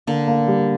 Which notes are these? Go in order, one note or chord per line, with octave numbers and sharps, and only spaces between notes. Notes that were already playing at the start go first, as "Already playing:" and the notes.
D3 A#3
A#3
G3